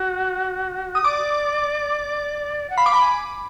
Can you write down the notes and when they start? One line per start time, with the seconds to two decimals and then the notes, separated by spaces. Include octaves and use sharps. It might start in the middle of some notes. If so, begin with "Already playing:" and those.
Already playing: F#4
0.95 D#6
1.04 D5 D6
2.70 F#5
2.77 F5 B5
2.86 D6
2.93 A#5 B5
3.00 G#5